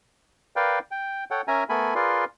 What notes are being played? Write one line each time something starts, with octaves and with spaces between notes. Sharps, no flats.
A#4 B4 D5 F5 G5
G5
A4 C#5 F#5 G5
C#4 A#4 E5 G#5 A#5
A3 B3 A4 A#4 G#5 B5
F4 G#4 A#4 B4 D5 C6